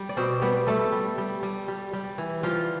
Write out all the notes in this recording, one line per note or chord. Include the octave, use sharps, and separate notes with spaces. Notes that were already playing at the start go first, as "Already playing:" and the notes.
Already playing: G3
D5
B2 C4 C5
G3 B3 B4
G3 A3 A4
G3
G3
G3
G3
G3
E3
F3 G3 F4